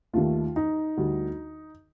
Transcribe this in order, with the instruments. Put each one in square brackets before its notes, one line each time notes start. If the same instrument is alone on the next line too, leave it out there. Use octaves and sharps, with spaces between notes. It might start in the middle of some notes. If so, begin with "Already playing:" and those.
[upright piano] D#2 D#3 A3 F4
D#4
D2 D3 G3